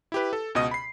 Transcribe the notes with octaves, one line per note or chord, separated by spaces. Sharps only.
E4 G4 B4
A4
C#2 B2 D#5 D#6
B5 C7